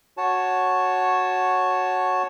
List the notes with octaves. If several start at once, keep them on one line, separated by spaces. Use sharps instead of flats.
F#4 C#5 A5